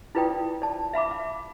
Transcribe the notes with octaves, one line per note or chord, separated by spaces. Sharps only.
E4 F4 B4 D5 G5 D#6
D5 A5
E5 F5 B5 D6
F5